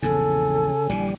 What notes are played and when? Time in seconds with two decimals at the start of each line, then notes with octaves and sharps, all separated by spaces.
0.02 A#1 E2 G#2 C#3 A4 G#5
0.89 A#1 D3 E3 G3